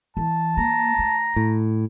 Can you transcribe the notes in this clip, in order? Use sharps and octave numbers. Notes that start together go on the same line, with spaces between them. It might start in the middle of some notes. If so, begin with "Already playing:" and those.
E3 A5
A#3 A#5
A3
A2